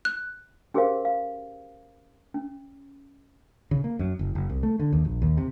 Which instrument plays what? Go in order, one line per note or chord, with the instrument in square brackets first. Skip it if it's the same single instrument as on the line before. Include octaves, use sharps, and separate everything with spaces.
[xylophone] F#6
[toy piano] C#4 G4 G#4 A#4 C5 F5
F5
C#4
[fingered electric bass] C#3
A#3
F#2
F#1
F#1
C2
A3
D3
D#2
A#1
D#2
C3